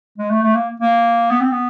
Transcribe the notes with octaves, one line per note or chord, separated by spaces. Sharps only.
G#3
A3
A3
A#3
A#3
B3
C4
B3